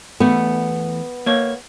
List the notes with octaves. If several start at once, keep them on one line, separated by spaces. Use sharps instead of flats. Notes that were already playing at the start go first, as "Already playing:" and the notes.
E2 A3 B3
A#3 C#5